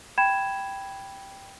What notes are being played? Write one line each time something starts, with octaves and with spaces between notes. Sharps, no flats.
G5 B5 G#6 E7